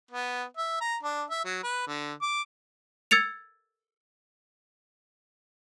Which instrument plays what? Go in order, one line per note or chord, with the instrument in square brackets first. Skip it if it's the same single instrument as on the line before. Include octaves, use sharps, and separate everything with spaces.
[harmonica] B3
E5
A#5
D4
E5
F#3
B4
D3
D6
[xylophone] E6 G#6 A6 C#7 F7